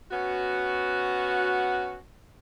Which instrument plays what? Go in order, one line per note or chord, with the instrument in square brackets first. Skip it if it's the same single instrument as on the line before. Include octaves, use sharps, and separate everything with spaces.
[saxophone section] B3 C#4 F#4